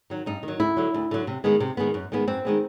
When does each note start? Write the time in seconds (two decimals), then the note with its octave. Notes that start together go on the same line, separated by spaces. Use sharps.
0.10 D#3 F#3
0.26 G2 D#4
0.43 D#3 F#3
0.60 D2 E4
0.77 D3 F#3
0.94 D2
1.11 D3 F#3
1.27 C3
1.44 D#3 G#3 B3
1.60 C3
1.77 D#3 G#3 B3
1.94 F#2
2.12 D#3 G#3 B3
2.28 F#2 C4
2.45 D#3 G#3 B3